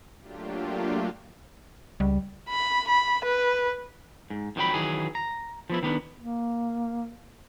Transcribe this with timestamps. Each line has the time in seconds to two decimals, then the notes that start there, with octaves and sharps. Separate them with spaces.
0.20 F#3 A3 A#3 D4 F4 G4
2.00 C#2 G3
2.49 B5
2.88 B5
3.24 B4
4.30 G#2
4.56 F2 D#3 F#3 G5 B5
4.74 D#3 E3 F#3 G#4
5.15 A#5
5.70 F3 B3 E4
5.83 D#3 B3 D4
6.18 A#3